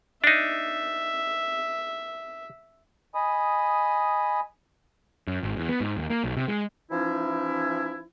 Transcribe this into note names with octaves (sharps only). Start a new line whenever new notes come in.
D4 D#4 E5
D#5 G#5 B5 D#6
F#2
G#1
E2
B3
G#2
D#2
A#3
B1
C3
G#3
E3 F3 C#4 D#4 E4